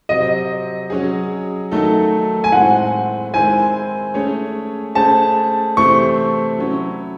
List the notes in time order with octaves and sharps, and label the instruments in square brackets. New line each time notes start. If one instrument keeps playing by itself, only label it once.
[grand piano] C3 F#3 C4 [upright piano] D#5
[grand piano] F#3 C#4 G#4
D#3 F#3 A3 D#4 A4
[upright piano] G#5
[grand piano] A2 G#3 C4 [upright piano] F#5
[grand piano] D#3 G#3 C4 E4 C5 [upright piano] G#5
[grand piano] A3 C#4 G#4 C#5
[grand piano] A3 C#4 G#4 C5 [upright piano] A5
[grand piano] C3 E3 A3 C4 [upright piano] C#6
[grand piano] F#3 C#4 E4